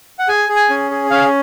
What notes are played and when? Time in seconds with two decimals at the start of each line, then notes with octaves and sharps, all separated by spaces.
0.19 F#5
0.28 G#4 G#5
0.49 G#4
0.56 G#5
0.70 C#4
0.91 G#4
1.11 C#4 F5